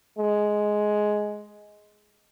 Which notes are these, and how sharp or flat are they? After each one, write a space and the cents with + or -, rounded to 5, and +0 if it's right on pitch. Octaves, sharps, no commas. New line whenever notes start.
G#3 +10